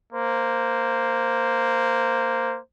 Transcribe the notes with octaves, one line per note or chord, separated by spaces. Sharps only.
A#3 C5